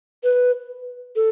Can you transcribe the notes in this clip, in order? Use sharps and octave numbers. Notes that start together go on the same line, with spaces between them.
B4
A4